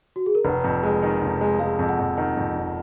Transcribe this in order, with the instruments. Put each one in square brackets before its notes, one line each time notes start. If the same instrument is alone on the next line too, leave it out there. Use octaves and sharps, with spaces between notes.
[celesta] F#4
G#4
A#4
[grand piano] F1 [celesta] B4
[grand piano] F2
G#3
D#3
F1
G#3
[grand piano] G#3 [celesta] F5
[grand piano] F2
[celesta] F#5
[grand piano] F2
[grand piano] D#3 [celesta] F#5
[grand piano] F2
F1